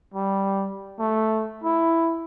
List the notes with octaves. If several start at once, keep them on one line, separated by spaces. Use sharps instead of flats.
G3
A3
E4